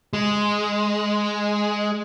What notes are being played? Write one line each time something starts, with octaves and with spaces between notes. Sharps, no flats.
G#3